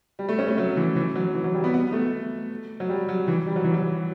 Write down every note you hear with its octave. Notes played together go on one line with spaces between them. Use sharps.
G3
A3
C#4
A3
F#3
E3
E3
F#3
E3
F#3
G3
B3
B3
A3
F#3
G3
F#3
E3
G3
F#3
E3
F#3